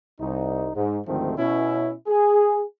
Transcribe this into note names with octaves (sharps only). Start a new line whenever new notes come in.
C2 D#4
G#2
D2 G#2 D#3 F3 A3 C4
B2 C#4 E4
G#4